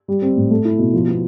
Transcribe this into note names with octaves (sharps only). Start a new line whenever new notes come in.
G3
C4
A2
A3
E4
B2
F3
B3